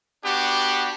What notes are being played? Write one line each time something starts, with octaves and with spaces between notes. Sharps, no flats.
B3 D4 F#4 G4